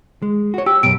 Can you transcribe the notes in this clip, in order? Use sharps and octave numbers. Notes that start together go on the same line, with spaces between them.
G#3
F#4 C#5
G4 E6
F#2 B2 D7